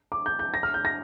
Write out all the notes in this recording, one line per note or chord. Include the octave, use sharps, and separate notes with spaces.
D6
G6
G6
A#6
F6
G6
A#6